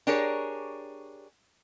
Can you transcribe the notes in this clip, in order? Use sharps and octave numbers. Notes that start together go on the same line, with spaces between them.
D4 G4 G#4 A#4 C#5